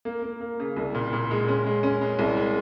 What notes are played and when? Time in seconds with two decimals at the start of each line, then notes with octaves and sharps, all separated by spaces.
0.05 A#3
0.23 A#3
0.41 A#3
0.60 C#3
0.76 C2
0.95 A#2
1.13 A#2
1.31 G#3
1.48 C#4
1.66 G#3
1.83 C#4
2.01 G#3
2.19 C2
2.37 G#3